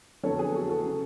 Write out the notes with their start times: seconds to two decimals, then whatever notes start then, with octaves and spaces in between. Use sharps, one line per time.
0.23 F2 D3 F#3 B3 A4 C#5
0.39 G#4 B4
0.54 F#4 A4
0.69 F#4 A4
0.86 C#3